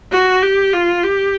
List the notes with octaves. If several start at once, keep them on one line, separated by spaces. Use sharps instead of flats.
F#4
G4
F4
G4